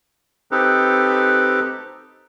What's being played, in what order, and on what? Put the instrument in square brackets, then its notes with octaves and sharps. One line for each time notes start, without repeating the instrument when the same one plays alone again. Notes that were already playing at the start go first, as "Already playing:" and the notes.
[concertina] C4 D#4 G4 A4 B4